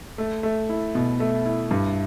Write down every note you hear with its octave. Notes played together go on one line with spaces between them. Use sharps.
A3
A3
E4
B2
A3
E4
G2